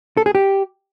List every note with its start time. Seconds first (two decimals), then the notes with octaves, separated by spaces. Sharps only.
0.17 A4
0.26 G#4
0.35 G4